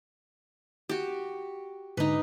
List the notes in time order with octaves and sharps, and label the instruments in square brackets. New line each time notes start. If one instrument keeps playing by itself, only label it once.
[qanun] F#4 G4
[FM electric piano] G#2 D3 [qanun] D#4 B4